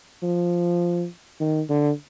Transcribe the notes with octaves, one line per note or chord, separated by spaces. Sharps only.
F3
D#3
D3